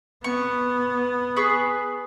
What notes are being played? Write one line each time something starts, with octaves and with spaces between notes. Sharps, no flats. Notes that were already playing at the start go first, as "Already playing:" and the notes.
B3 C#6
G#4 B4 C#6